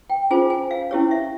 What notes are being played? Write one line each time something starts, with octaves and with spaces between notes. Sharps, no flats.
G5
C#4 F4 G#4 C5 G#5
G#5
F5
C#4 E4 G4 C#5
E5